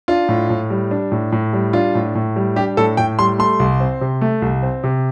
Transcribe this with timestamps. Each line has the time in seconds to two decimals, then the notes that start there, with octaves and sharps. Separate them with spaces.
0.08 D4 F4
0.29 A2
0.50 A2
0.70 G3
0.91 D4
1.12 A2
1.32 A2
1.53 G3
1.73 D4 F4
1.95 A2
2.15 A2
2.36 G3
2.56 D4 G4
2.77 A2 A4
2.97 A2 G5
3.19 G3 C6
3.39 A3 C6
3.59 C2
3.80 C4
4.01 C3
4.21 A3
4.42 C2
4.62 C4
4.83 C3